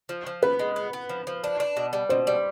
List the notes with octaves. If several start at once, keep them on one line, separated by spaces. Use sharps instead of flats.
F3
F3
B3 B4
G#3
B3
B3
F3
F3
D4
D4
B2
G3
B2 C5
G3